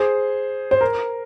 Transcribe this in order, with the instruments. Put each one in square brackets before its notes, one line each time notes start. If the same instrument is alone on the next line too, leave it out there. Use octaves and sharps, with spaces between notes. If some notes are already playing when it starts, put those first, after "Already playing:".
Already playing: [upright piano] G#4 C5
C5
A#4